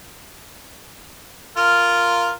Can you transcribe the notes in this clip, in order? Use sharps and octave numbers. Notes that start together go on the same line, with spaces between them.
F4 A#4